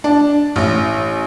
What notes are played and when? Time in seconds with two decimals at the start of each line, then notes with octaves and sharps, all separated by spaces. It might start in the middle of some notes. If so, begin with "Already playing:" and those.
0.04 D4
0.56 A1